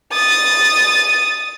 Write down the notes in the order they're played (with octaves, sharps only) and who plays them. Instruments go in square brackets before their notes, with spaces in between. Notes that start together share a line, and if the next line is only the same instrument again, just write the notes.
[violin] D#6 A6